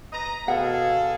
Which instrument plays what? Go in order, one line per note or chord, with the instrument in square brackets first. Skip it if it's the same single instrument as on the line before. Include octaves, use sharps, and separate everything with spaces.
[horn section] B4 D#5 A#5
[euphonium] B2 [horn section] G#4 A4 [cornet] F5 [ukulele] F#5